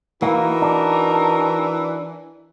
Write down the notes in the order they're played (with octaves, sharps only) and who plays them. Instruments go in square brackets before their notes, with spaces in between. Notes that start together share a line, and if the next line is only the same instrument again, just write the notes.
[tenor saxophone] E3 [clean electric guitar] A#3 [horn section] D#4 F#4 A#4
[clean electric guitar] D4